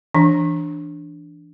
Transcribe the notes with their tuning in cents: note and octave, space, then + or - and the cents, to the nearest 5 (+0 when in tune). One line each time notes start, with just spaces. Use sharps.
E3 +10 D4 +0